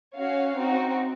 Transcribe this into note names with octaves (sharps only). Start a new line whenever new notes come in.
C#4 F#4 C#5 F5
C4 D#4 F#4